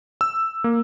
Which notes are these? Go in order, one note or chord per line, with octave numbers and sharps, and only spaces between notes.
E6
A#3